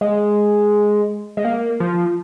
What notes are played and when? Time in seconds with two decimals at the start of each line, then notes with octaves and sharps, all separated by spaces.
0.01 G#3
1.37 G#3
1.45 A#3
1.80 F3